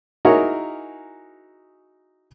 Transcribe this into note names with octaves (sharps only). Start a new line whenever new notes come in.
D#4 E4 F#4 G#4 A#4 C#5